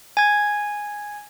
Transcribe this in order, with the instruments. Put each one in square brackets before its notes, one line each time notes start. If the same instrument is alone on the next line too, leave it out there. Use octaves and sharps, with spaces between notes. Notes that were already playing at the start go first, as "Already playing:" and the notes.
[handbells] G#5 G#6